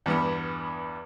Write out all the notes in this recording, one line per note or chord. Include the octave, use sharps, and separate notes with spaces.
E2 G2 B3